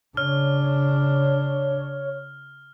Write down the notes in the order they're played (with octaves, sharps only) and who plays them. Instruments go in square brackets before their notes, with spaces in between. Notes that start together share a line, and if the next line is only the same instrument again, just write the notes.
[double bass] C#3 D4 [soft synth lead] C#5 [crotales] F6